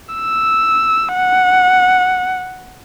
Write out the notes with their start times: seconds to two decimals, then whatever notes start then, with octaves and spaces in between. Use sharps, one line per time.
0.15 E6
1.15 F#5